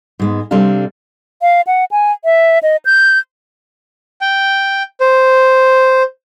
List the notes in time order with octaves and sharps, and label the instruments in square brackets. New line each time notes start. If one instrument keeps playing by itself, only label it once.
[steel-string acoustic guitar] G#2 G#3 B3
C3 G3 C4 D4 A4 F5
[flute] F5
F#5
G#5
E5
D#5
G6
[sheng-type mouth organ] G5
C5